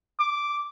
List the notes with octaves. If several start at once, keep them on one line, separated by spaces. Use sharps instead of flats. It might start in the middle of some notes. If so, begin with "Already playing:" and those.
D6